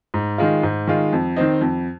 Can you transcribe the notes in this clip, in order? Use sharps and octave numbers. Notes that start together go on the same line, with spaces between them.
G#2
D#3 G#3 F4
G#2
D#3 G#3 F4
F2
D#3 C4 D#4
F2